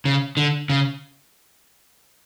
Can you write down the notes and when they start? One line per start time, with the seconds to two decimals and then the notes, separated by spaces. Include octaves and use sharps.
0.05 C#3
0.37 D3
0.69 C#3